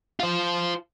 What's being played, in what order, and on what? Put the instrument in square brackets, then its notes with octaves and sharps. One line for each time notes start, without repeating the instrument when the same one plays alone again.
[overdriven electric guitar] F4 C5